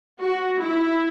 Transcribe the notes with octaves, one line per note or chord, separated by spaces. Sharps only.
F#4
E4